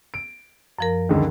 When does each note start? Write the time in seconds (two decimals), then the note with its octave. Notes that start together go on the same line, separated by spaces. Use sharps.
0.14 D7
0.79 F#2 F3 A#4
1.09 C#2 D3 D#3